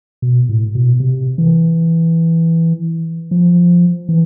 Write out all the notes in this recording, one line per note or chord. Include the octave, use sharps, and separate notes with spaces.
B2
A2
B2
C3
E3
F3
E3